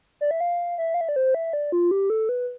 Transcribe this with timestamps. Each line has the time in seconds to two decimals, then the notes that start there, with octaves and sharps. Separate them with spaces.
0.21 D5
0.31 E5
0.41 F5
0.78 E5
0.94 F5
1.01 E5
1.09 D5
1.16 C5
1.34 E5
1.53 D5
1.72 F4
1.91 G4
2.10 A4
2.29 B4